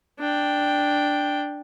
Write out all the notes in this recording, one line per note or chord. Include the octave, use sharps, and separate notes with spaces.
D4 G5